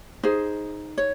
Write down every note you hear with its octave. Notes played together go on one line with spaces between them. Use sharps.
D#4 G#4 C5
C#5